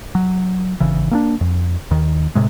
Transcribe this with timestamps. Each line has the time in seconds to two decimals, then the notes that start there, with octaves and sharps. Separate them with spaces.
0.15 F#3
0.80 G#1 C#3 E3
1.11 A#3 C4 D4
1.41 F2
1.91 D#2 D#3
2.35 A2 C3 G#3